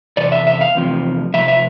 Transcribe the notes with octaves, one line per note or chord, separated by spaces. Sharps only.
E2 C3 D5
E5
E5
F5
E2 C3 F3
C3 F3 E5
E5